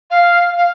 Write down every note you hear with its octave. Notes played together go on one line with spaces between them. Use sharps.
F5
F5